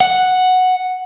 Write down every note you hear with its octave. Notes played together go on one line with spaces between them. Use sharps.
F#5